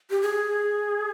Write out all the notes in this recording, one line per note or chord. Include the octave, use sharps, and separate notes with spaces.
G4
G#4